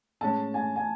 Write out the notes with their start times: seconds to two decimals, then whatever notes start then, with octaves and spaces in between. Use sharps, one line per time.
0.21 A2 G#3 C#4 A5
0.54 G#5
0.76 G#5